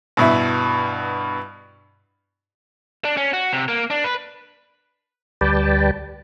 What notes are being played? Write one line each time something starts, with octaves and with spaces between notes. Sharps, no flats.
G2 B2 E4
D4
C#4
F#4
C3
A#3
D4
B4
D2 G3 B4 D5 G5 A5